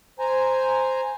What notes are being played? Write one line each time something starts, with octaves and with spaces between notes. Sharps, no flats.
C5 G#5 A#5